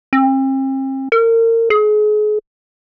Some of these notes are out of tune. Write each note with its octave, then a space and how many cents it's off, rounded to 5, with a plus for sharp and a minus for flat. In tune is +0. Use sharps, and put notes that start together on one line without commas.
C4 +40
A#4 -30
G#4 +35